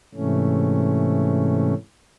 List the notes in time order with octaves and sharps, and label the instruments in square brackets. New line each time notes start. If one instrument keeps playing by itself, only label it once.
[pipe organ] G#2 C3 E3 A3 C#4